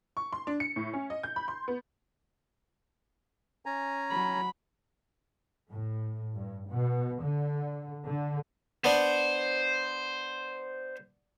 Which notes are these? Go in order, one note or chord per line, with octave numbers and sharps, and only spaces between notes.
C#6
C6
D4
C#7
A2
C#4
D#5
G6
B5
C6
B3
C#4 G#5 A#5
F#3 B5
A2
G2
B2
D3
D3
B3 D4 C5